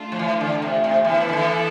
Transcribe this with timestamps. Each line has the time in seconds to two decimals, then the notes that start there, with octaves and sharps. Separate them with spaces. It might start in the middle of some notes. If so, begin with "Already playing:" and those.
Already playing: A3 D4 F4
0.12 F3
0.19 E3
0.41 D3
0.62 C3
0.84 C3
1.04 E3 B3 E4 A4
1.29 D3
1.33 E3